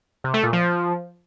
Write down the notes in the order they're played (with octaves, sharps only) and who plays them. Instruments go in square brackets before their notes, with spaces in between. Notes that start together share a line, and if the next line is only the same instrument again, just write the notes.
[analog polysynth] C3
A3
A#2
F3